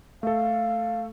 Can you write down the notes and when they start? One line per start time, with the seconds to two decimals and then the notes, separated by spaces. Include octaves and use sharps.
0.23 A3 A4 F5